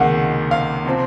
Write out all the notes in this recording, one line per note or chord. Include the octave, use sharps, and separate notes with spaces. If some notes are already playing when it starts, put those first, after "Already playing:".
Already playing: C#2 C3 D#3 A#3 F5 F#5
F5
C3 F3 C4